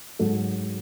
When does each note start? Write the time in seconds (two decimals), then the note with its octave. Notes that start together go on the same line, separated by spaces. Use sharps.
0.19 G#2 F#3 A4